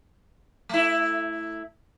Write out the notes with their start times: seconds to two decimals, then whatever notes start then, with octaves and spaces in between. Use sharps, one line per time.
0.69 A3 E4